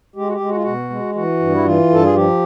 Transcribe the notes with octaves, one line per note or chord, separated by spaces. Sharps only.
G#3 G4
F#4
G4
G#3
F#4
F4
B2 F#4
G#3
E3 F#4
G2
E4
E3 F4
G2 A4
G#4
F3 G4